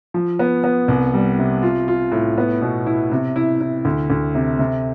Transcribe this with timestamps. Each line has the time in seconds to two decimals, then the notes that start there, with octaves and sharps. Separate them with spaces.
0.14 F3
0.39 B3
0.64 B3
0.88 C2
1.14 G3
1.39 C3
1.62 F4
1.88 F4
2.12 A2
2.38 B3
2.62 B2
2.86 E4
3.12 C3
3.36 E4
3.61 E4
3.85 D2
4.10 D2
4.35 C3
4.59 C3